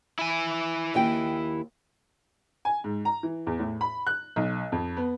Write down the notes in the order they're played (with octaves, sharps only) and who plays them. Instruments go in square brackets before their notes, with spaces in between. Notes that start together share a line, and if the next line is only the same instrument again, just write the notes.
[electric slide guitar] E4 G#5
[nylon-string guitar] D#2 G5
[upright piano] G#5
G#2
A#5
E3
E2
A2
B5
F#6
B1
F2
B3